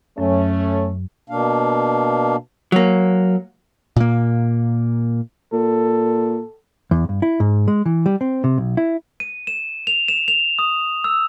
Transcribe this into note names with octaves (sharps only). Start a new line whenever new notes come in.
F#2 F#3 A3 C#4
B2 A#3 D4 F5
F#3 A#3
A#2 A#3
A#2 A4
E2
G2
E4
G#2
G#3
E3
G3
C4
C3
B1
E4
D#7
E7
F7
E7
F7
D#6
E6